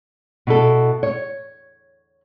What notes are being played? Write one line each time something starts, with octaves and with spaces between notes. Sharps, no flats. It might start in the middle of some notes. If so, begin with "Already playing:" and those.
B2 E4 A4
C#5